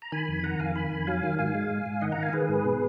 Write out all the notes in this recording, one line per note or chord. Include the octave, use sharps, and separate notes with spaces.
A#5
D#3 G#5 B5
F2
D#3 F#5 A#5
F2 F5 G#5
D#3 G#5 B5
F2
F#3 F5 G#5
D#3
G#2 F5 G#5
G#3
G#2
G#2
D#3 D#5 F#5
F#5 A#5
D#3 F5 G#5
D#3 G#4 B4
G#2
B2